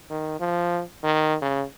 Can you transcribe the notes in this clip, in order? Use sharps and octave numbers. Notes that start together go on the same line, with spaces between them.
D#3
F3
D#3
C#3